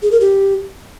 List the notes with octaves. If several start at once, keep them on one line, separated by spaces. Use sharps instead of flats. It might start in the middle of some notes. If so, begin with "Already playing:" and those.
G#4
A#4
G4